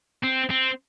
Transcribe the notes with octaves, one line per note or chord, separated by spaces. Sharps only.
C4
C4